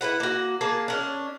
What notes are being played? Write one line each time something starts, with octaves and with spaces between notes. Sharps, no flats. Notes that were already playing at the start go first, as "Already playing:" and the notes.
E4 G#4 B4 F#5
A#3 F#4
A#3 G#4 A5
C#4 D4